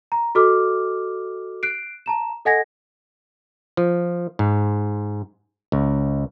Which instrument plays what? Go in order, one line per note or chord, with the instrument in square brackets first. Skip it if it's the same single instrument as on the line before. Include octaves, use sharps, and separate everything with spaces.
[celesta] A#5
F#4 A4 D#5 D6 F6
F#6 C7 D7
A5 A#5 E7
A4 D#5 F#5 G#5 G#6 A#6
[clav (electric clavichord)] F3
G#2
C#2